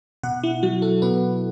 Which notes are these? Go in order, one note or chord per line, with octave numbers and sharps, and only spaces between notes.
B2 F#5
E4
F#3 F#4
A4
B2 B4